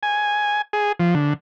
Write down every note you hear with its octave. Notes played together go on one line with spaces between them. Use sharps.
G#5
G#4
F3
D3